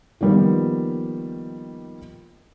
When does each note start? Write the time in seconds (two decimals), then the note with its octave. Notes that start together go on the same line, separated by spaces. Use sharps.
0.21 D#3 F3 G3 A#3 B3